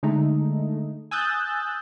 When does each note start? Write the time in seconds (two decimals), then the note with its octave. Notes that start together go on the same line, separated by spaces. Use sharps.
0.03 D3 G#3 A3 D#4
1.11 G#5 D#6 E6 F#6 G6 A6